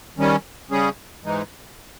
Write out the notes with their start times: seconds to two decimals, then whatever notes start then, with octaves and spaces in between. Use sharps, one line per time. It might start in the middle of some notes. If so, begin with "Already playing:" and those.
0.17 D#3 G3 C#4
0.71 C#3 G3 C#4 G#4
1.24 G#2 E3 G#3 D#4